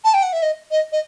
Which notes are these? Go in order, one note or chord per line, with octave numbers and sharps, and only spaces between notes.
A5
G5
F#5
E5
D#5
D#5
D#5